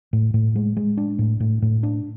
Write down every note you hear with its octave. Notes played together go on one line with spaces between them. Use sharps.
A2
A2
G#3
G#3
D4
A2
A2
A2
D4